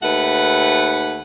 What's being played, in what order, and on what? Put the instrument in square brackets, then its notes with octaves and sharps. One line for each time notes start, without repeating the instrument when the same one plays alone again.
[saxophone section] D#2 A3 B4 F#5